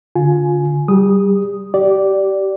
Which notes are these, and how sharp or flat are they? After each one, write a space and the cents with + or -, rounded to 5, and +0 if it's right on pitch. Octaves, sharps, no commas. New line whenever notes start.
D3 -25 F4 +20 G#5 +15
G3 -20 G4 +45 D#6 +0
G4 -25 D5 -5